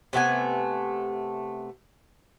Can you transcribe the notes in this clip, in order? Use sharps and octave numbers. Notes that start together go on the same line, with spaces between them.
C3 A3 B3 G#5